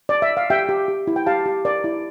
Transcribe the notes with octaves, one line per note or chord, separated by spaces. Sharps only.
D5
E5
F5
G4 E5 G5
G4
G4
E4
G5
G4 F5 A5
G4
A#4 D5
E4